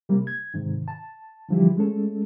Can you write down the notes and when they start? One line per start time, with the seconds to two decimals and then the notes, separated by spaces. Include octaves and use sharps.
0.09 C3 G3 A#3
0.27 G#6
0.54 G#2 C3 D#3
0.88 A5
1.49 D3 E3 F3 G3 E4 G4
1.77 G#3 A3 C#4 A4